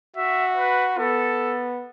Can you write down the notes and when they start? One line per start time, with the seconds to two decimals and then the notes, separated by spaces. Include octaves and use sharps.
0.16 F#4 E5
0.57 B4
0.98 B3 A4